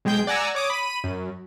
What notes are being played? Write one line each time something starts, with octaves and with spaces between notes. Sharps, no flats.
B1 G#3 G#4 G5 G6
D5 F#5 G#5 A#5 E6
C#5 D6 D#6
B5 D#7
F#2